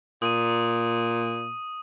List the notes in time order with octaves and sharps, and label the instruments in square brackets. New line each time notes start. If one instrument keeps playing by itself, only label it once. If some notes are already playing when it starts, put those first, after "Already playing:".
[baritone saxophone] A#2 [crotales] D#6 D#7